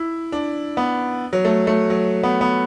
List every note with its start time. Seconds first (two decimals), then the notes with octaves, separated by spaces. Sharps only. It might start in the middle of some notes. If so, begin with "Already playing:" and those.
Already playing: E4
0.32 D4
0.77 B3
1.33 F#3
1.45 A3
1.67 A3
1.90 F#3
2.23 B3
2.41 B3